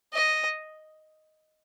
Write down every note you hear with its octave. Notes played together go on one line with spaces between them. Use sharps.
D#5